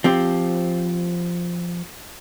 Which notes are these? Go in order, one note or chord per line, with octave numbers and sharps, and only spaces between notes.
F3 C4 G4